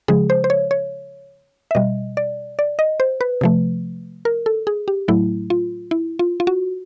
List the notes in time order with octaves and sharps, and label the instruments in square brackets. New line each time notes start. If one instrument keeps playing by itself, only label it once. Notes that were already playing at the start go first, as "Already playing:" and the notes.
[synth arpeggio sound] C#3 F3 G#3 G#4
C5
C5
C#5
C#5
E5
B2 G3 D#5
D5
D5
D#5
C5
B4
C3 F3 A3
A#4
A4
G#4
G4
A2 F#3 A3 E4
F4
E4
F4
F4
F#4